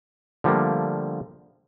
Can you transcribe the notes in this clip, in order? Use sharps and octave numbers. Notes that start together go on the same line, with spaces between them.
D3 F3 G3 A3 A#3